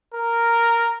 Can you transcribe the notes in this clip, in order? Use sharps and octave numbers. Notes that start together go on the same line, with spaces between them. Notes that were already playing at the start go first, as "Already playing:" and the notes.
A#4